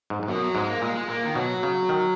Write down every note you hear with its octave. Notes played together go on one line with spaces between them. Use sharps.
G#2
G#2
F#2 B2
F#3
G#2 G#3
A#3
A#2 G#3
G#3
A#2 A#3
D#3
B2 F#3
C#3
D#3